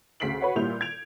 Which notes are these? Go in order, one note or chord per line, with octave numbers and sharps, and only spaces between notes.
D2 C#3 B6 C7 D7 F#7
F#4 B4 C#5 F#5
A#2 G3 E4 G6 F7
G#6 D7 F7